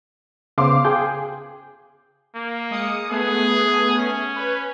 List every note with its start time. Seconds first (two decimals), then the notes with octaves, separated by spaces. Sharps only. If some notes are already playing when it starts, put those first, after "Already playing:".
0.58 C#3 B3 C5 F5 C6 D6
0.85 G#4 G5 G6
2.35 A#3
2.71 G#3 D#6 C#7
3.11 A3 B3 G#4
3.98 C#4
4.36 B4 C#5